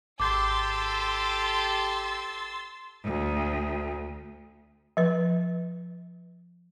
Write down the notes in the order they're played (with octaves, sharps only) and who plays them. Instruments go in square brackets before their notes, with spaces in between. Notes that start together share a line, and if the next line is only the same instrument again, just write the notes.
[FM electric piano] G#1 G6 [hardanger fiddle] G4 A4 [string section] C6 E6 A6 [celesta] D6
[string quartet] D2
[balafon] F3 B4